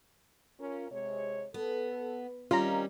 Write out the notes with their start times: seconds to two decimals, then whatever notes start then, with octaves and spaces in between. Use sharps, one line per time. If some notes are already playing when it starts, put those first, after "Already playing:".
0.58 C#4 F4 A#4
0.91 C3 G#3 C#5
1.54 B3 A4
2.51 D#3 G3 C4 C#4 F4 A#5